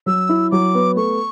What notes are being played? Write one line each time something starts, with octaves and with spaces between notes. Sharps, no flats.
F#3 E6
E4
F#3 D6
B3
A3 C#6